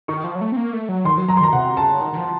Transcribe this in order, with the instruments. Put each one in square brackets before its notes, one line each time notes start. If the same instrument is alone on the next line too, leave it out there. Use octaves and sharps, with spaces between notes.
[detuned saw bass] D#3 [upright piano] C#6
[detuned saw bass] F3
F#3
A3
C4
A#3
A3
F#3
[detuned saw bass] D#3 [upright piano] C6
[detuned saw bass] F#3
[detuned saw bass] F#3 [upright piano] A#5
[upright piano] C6
[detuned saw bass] D#3 [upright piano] A#5
[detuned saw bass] C3 [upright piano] F#5
[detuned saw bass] C#3 [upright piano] A5
[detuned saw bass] D#3
D#3
F3